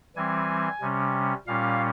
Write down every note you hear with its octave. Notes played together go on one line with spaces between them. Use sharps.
E3 G3 C4 G#5
C3 G3 C#4
A#2 G3 C#4 F5